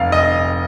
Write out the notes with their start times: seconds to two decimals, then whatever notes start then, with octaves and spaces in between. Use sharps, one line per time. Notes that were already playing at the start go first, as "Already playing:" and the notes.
Already playing: F1 F5
0.12 D#5